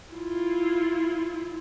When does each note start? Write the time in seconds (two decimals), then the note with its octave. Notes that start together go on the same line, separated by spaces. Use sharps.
0.13 E4 F4